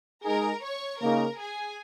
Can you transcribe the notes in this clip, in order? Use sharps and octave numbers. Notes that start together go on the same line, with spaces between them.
G#3 D#4 G#4 A#4 A#5
C#5 C#6
C#3 A#3 D#4 A#4 A#5
G#4 G#5